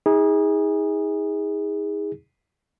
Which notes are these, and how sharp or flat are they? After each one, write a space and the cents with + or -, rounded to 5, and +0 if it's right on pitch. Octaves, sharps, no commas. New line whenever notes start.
D#4 +40 G#4 -20